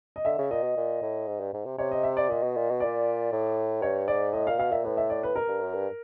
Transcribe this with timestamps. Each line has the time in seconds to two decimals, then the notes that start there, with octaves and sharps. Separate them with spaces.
0.16 D#5
0.25 D3 E5
0.38 C#3
0.51 A#2 D#5
0.64 B2
0.76 A#2
1.02 A2
1.28 G#2
1.40 G2
1.54 G#2
1.65 C3
1.78 C3 C#5
1.91 D#5
2.03 E5
2.17 D5
2.30 A#2 D#5
2.43 B2
2.57 A#2
2.71 B2
2.80 A#2 D5
3.32 A2
3.82 G2 C#5
4.08 G#2 D5
4.33 A2 D#5
4.47 A#2 F5
4.59 B2 F5
4.72 A#2 E5
4.85 A2 B4
4.97 E5
5.10 D5
5.23 B4
5.36 A#4
5.48 G2
5.61 F#2
5.74 G2